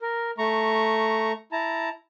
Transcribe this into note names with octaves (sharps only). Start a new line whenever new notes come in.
A#4
A3 A#5 C#6
E4 A5 A#5